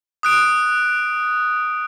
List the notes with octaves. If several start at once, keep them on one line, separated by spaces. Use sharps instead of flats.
D#6 F#6 D7